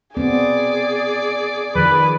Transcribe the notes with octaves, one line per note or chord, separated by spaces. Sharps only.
B3 C4 G#4 D5
D#3 F3 B4